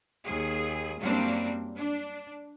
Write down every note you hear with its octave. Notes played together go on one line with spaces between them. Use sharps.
D#2 G#4
F#2 F#3 G3 A#3 C4 D4
D4